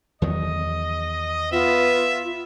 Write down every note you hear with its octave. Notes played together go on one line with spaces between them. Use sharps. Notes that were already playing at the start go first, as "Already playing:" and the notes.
E2 D#3 F#3 D#5
B3 F4 E5